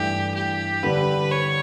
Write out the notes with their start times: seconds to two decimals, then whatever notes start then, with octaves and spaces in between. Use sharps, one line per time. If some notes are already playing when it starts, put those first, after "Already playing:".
Already playing: G2 E3 A3 D4 G4
0.35 G4
0.83 D3 G3 D4 B4
1.31 C#5